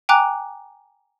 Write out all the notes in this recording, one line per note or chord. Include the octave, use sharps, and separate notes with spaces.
G5 G#5 A#5 D6 F#6